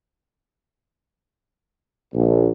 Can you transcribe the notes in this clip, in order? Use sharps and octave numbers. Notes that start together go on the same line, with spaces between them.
A#1